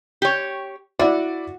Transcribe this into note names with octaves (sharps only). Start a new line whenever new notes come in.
G4 C#5
E4 F#4 D5